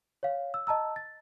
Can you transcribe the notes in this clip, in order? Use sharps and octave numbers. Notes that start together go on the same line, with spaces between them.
C#5 F5
E6
D#5 A5 A#5 E6
A6